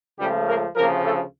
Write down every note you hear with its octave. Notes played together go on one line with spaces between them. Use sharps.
C#2 C#3 F3 G3 A3 G4
A#3 A#4
D2 C#3 F3 A#3 A#4
A3 A4